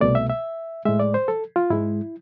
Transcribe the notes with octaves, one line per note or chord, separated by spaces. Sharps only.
C2 B2 A3 D5
E5
E5
A2 G#3 E5
D5
C5
A4
F4
G#2 G#3 E4